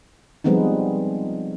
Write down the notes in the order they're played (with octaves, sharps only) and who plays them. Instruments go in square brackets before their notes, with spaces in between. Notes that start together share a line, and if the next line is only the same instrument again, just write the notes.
[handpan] F3 G3 G#3 B3 C4 D#4